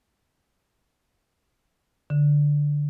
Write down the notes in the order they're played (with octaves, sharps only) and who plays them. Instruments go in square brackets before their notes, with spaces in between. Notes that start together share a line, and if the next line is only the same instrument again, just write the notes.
[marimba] D3